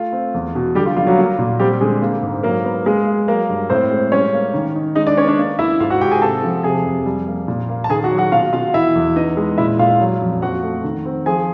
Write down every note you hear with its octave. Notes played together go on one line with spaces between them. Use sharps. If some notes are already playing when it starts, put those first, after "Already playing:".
Already playing: A3 F4
C4
E2
B2
D3 G3 G4
F4
G3 F4
F#3 F#4
A#3
A#2
G3 C4 G4
D3 G#3 G#4
A#3
G#2
F#3 A#3 A#4
B3
G#3 A#3 G#4
A#3
F#3 A#3 A#4
G2
A2 C4 C5
G#3
G3 C#4 C#5
A#3
D#3
D#4
G#3 D#4 D#5
D4 D5
B3 C#4 C#5
D4 D5
A#3
A#3 E4 E5
G#2 F4 F5
F#4 F#5
G#2 G4 G5
G#4 G#5
C3 A4 A5
F3
C3 G#4 G#5
F2
G3
A#3
A#2
A#3
A5
D#3 G#4 G#5
F#4 F#5
F#3
F#4 F#5
B2 F4 F5
B2 F4 F5
E3 E4 E5
E2
B3 D#4 D#5
G#3
A#2 E4 E5
A#2 F4 F5
F#3
F2
F3 F#4 F#5
A3
D#3
C4
F3 G#4 G#5